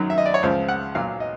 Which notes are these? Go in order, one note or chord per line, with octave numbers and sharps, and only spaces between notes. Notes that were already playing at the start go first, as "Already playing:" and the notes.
Already playing: F#2 D#3 F#3
E5
D#5
D5
C#5
C#2 C#3 F3 C5
F#5
B1 A#2 F#3 F5
D#5